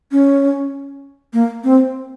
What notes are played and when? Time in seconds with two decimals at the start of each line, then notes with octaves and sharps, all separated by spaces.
0.12 C#4
1.33 A#3
1.64 C4